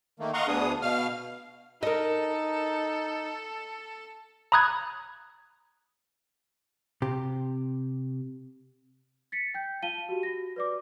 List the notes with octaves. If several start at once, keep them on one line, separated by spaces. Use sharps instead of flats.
D#3 A3 A#3
D#5 F5 F#5 A#5 C6 C#6
D2 B3 D4 G#4 D#6
B2 F5 F6
D#4 A4 A#4 D#5
A#5 B5 D#6 F#6 G#6
C3 G4
A6 B6 C#7
G5 G6
F4 F5 A5 D#7 G7
F#4 G4
F#4 A#6
B4 D5 D6